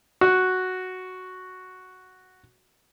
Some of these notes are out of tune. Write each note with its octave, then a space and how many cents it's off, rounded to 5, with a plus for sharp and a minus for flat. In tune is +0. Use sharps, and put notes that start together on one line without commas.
F#4 +0